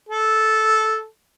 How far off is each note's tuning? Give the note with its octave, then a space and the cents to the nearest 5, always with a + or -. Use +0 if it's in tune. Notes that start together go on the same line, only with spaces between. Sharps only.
A4 -10